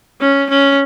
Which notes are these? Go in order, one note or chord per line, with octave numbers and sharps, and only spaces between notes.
C#4
C#4